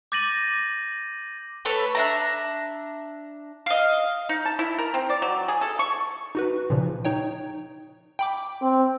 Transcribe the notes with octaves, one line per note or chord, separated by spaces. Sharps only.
D6 G6 A6 A#6 D#7 F#7
A3 A4 B4 C#5
D4 E5 A#5
D#5 F5
D#4
A5
E4
A#4
C4
D5
F#3
G#4
A4
C#6
D#4 F#4 B4
A#2 C#3 F3
D#4 C#5 G5
G5 B5 D6
C4